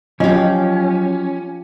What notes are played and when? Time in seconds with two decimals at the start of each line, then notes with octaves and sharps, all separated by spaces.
0.20 F3 F#3 C#4 G4 D#5